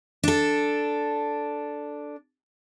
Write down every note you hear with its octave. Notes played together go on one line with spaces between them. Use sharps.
D4 A4